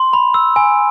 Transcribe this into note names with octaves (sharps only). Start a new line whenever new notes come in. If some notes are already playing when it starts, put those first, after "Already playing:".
Already playing: C6
B5
E6
G#5